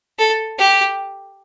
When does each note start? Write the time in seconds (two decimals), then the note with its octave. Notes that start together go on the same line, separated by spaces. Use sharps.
0.19 A4
0.59 G4